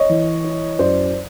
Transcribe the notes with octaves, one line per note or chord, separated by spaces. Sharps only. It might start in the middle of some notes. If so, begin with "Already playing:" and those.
Already playing: C#5 D#5
E3
E4
F#2 C5 D5